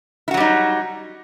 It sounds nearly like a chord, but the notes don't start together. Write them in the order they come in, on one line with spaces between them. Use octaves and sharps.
E4 F#4 F#3 G3 D#4